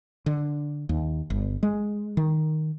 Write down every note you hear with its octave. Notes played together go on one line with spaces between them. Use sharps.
D3
D#2
G1
G#3
D#3